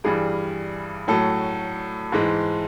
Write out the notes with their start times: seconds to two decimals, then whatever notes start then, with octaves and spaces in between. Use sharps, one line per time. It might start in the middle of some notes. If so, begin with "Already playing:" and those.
0.04 G2 E3 G3 G#4
1.08 A2 F#3 A3 A4
2.12 G#2 E3 G#3